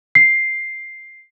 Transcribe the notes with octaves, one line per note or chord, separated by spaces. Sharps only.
C7